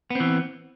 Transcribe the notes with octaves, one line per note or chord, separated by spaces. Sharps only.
E3 B3 C4